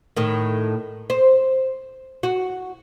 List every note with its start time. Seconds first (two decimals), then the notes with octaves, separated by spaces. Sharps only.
0.17 A2 D#3
1.10 C5
2.23 F#4